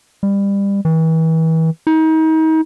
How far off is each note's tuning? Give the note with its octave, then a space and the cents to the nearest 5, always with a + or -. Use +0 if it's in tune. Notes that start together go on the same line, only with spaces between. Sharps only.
G3 +25
E3 -35
D#4 +35